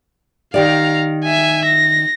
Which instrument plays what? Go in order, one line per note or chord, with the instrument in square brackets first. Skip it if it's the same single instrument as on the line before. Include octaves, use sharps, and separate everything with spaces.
[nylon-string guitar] D#3 G4 D5 [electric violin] F5 A#5
[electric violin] E5 G#5
A#6